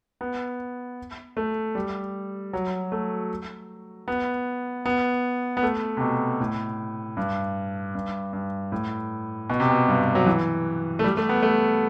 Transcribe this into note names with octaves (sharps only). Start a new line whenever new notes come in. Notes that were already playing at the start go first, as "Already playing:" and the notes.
B3
A3
G3
F#3
A3
B3
B3
B3
A3
C3
B2
A2
G2
G2
G2
A2
B2
C3
B2
G2
F#3
E3
A3
G3
A3
B3
A3